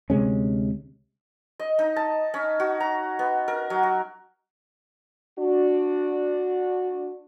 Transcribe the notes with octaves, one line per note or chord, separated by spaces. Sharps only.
D2 C3 G#3 C#4
D#5
D#4
A5
C#4
F#4
A#5
B3
A#4
F#3
F#4
D4 F#4